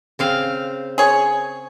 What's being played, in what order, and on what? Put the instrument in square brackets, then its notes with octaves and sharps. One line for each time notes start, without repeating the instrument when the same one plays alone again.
[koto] C#3 C4 F5
[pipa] G#4 C#5